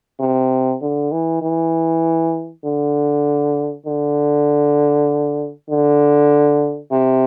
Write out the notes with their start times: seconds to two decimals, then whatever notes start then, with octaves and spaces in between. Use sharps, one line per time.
0.20 C3
0.82 D3
1.12 E3
1.42 E3
2.65 D3
3.86 D3
5.70 D3
6.92 C3